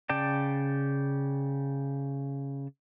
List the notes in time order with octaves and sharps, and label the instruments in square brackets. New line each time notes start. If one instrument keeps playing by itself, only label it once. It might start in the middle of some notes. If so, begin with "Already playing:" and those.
[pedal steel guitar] C#3 D5 G5 A5